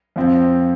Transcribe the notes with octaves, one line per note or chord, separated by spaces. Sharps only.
F2 F3 C4